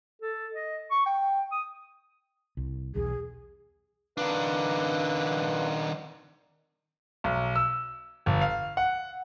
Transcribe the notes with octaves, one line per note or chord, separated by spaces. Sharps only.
A4
D#5
C#6
G5
D#6
C2
B1 E2 G#4
D#3 D4 B4 F5
B1
E6
G1
F5
F#5